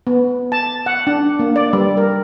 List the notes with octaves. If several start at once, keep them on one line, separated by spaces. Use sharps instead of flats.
B3
A5
F#5
D4
A#3
D5
G3
A#4